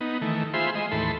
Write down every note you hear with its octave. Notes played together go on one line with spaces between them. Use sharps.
B3 D#4
D#3 E3 A3
F4 G#4 C5 E5 B5 C6
G#3 D#5 C6
D#2 A2 E3 A4 B5 C6